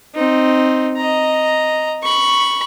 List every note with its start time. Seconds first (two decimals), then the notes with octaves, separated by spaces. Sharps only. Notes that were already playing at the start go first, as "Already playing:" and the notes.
0.15 C4 D#4
0.97 D#5 A#5
2.03 B5 C#6